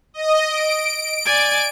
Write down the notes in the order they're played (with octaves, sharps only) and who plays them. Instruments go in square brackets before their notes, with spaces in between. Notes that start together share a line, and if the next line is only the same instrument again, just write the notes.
[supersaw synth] D#5
D7
[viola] D5 G#5